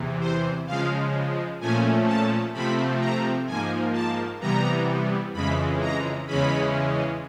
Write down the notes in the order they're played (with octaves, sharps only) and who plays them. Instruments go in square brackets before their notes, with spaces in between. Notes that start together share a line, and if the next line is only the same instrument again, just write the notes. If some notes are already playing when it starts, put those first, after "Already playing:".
Already playing: [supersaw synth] E2 C3 E3
C5
C#3 F3 G#3 F5
A#2 F3 A3 C#4 G#5
A5
C3 F3 A3 C4 B5
A#5
G#2 F3 A#3 G#5
A5
C3 E3 G3 B3 A#5
F2 C#3 E3 G#3 B5
A#5
E2 C#3 E3 G#3 C#4 B5